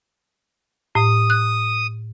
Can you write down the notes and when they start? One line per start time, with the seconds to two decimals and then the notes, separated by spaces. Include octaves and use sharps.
0.95 A2 D#6
1.30 F#6